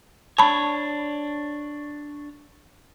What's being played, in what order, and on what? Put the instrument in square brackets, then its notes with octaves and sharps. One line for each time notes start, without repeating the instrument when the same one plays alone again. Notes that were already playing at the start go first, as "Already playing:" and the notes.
[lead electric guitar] D4 C#5 [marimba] A5 B5